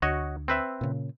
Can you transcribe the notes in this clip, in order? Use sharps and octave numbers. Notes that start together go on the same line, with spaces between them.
D2 F#4 C#5 D#5
C4 B4 E5
A#2 C#3